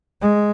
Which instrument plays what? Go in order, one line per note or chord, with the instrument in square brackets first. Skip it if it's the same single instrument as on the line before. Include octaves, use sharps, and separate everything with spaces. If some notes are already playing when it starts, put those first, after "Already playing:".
[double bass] G#3